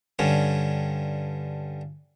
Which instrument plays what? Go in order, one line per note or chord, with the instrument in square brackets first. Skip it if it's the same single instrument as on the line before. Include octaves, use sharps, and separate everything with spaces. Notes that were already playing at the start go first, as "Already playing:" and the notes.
[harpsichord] G2 D3 C#4